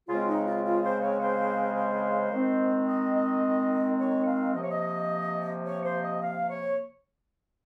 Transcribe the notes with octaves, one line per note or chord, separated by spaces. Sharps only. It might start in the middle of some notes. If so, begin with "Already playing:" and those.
C#3 G#3 C4 F4
D#4
F4
F4
C5
C#5
C5
C5
D#3 G#3 C4
D#5
D#5
C#5
F5
C3 F3 A#3 D#5
C#5
D#5
C#5
C5
D#5
F5
C#5